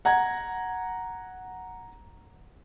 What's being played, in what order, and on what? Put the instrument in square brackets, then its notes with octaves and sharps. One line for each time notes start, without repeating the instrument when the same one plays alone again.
[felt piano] F#5 A#5 G#6